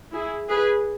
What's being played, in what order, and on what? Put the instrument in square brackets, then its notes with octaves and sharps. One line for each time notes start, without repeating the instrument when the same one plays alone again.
[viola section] E4 G#4
G#4 B4